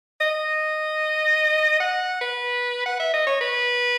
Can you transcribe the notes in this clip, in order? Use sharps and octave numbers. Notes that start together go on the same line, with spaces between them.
D#5
F#5
B4
F#5
E5
D#5
C#5
B4